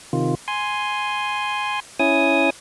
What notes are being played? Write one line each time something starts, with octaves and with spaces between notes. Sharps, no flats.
C3 D#3 F4
G#5 C6
C#4 E4 G#5 D#6